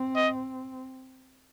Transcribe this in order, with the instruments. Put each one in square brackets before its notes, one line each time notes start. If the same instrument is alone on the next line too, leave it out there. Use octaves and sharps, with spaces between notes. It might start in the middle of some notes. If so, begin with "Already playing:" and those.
Already playing: [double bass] C4
[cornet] D#5